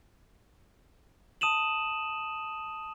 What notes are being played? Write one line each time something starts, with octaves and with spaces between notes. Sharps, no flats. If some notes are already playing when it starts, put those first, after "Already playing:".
A5 D#6 D#7 E7 F#7